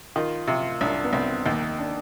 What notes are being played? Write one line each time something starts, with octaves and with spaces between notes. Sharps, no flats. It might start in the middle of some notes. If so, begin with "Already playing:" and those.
D#3 F4
C3 F4
C2 D4
B3
C2 C4
D#2 D#4
D4